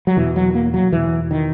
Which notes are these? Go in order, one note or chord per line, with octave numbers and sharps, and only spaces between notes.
F#3
E2 B2 E3
F#3
A#3
F#3
E2 B2 E3
D#3